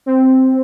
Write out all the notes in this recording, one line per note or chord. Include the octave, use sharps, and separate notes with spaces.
C4